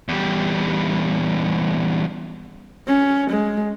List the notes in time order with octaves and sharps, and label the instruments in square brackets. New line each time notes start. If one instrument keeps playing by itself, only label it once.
[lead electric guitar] E2 G3
[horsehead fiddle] C#4
G#3